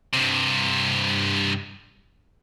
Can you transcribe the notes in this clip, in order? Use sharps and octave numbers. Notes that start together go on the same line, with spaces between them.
G2 C3